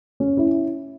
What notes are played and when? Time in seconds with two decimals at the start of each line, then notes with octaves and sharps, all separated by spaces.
0.20 C#4
0.37 E4